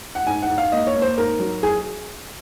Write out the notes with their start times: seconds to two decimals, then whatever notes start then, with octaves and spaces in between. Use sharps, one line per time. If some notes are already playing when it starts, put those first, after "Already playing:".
0.15 F#5
0.27 G#2 G#5
0.42 F#5
0.49 G#2
0.58 F5
0.72 A#3 D#5
0.87 C#5
0.95 A#3
1.02 C5
1.18 G#2 A#4
1.40 F#3
1.63 G#4